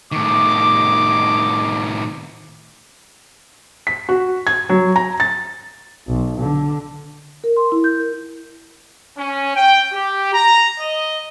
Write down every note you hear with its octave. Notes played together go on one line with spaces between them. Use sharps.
A2 D#3 C#5 D#5 D6
B6
F#4
G#6
F#3
A#5
A6
B1
D3
A#4
C6
E4
G6
A#4
C#4
G5
G4
A#5
D#5